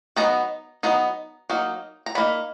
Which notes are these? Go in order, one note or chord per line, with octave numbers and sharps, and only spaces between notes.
F#3 B3 D#4 A#5
F#3 B3 D#4 A#5
F#3 A#3 D#4
A#5
F#3 A#3 D#4 B5